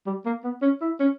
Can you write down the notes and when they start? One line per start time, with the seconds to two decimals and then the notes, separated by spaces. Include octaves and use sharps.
0.07 G3
0.26 A#3
0.44 B3
0.62 C#4
0.81 E4
1.00 C#4